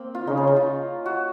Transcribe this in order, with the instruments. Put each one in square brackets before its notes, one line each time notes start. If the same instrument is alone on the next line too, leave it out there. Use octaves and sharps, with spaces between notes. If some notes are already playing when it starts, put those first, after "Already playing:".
Already playing: [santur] A#3 C4
F4
[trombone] C#3 [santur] D#4
[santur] C#4
D#4
F4
F#4